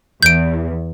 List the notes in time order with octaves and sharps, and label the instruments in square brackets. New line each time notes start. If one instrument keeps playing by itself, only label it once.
[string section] E2 [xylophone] G6 D7